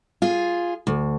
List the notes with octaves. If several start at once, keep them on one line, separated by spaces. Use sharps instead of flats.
F4 G#4
D2